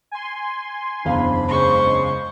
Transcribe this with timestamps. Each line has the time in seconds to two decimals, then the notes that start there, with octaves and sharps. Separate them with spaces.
0.11 G#5 C6
1.05 F#1 E2 C4 D4 F5 B5
1.47 C#3 G#3 C5 C#6